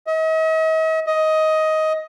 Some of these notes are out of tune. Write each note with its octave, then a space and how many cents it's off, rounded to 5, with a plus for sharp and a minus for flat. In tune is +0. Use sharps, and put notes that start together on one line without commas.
D#5 +45
D#5 +15